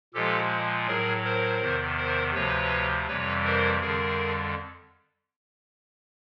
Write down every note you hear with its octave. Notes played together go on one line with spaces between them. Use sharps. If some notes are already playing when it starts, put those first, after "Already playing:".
A#2 F3 G#3 G4 A4
A2 F#3 G#4 A#4
A#4 C5
E2 C3 D#3
A#4 C5
D2 C3 F3 B4 C#5
F2 C3 E3 G3 B4 C#5
A#4 C5
F2 D3 G3 G#4 A#4